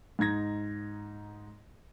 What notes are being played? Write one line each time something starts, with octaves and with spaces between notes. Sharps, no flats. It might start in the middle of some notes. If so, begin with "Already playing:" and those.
G#2 D#4 G#6 A#6